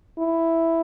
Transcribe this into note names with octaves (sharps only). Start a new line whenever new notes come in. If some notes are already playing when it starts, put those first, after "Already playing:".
E4